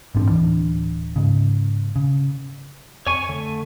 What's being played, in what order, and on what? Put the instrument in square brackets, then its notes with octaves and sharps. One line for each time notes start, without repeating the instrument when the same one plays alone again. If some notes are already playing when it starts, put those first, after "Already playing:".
[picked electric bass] A1 G#2 C4 D4
D1 E3 D4
G#2 C#3
C#3
[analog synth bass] F2 [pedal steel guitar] C#5 G#5 C#6
[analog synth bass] D3 [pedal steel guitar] A3